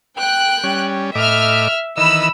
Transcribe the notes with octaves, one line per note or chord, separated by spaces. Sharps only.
G5 F#6
G3 C#4
A2 D#5 E5 D6 F6
D#3 E3 D#5 B5 E6